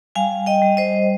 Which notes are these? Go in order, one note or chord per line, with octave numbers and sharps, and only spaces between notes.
G3 F5 G#5
D#5 G5
G3
C5 D#5